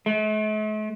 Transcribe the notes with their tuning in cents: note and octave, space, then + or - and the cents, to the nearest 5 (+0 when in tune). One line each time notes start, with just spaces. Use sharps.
A3 -45